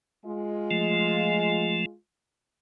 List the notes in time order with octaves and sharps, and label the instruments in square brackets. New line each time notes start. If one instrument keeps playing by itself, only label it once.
[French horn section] G#3 F4
[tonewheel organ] F3 A3